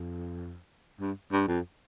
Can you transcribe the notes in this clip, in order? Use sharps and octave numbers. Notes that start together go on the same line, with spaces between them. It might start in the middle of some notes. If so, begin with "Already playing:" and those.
Already playing: F2
G2
G2
F2